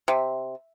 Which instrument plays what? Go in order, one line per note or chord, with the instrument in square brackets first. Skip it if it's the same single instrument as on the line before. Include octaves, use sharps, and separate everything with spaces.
[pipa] C3